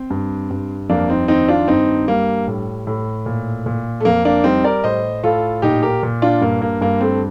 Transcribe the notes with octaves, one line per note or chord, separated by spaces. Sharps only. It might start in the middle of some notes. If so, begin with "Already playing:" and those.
Already playing: C4
G2
G2
F2 A#3 D4
C4 D#4
D#3 C4 D#4
D4 F4
G2 C4 D#4
G3 A#3
A2
A2
A#2
A#2
A3
F2 A#3
A#3 D4
G3 C4 D#4
A#4 D5
A2 C5 D#5
A2 F4 A4
A#2 D#4 G4
G4 A#4
A#2
D4 F4
G2 A#3
A#3
G2 A#3
A3 C4